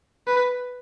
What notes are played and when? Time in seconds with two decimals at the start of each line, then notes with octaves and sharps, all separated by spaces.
0.27 B4